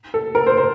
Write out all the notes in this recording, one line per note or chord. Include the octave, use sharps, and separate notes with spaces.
A4
A#4
C5
C5